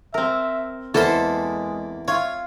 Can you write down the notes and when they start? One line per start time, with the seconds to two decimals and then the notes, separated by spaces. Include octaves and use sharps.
0.14 C4 A#4 E5
0.94 E2 G#3 A#3 A4 C5 B5
2.08 F4 C#5 E5